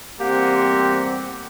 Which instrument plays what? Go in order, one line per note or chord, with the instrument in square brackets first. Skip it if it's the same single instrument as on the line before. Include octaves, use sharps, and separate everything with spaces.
[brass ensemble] E2 G3 C4 [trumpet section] A#3 F#5 [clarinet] G4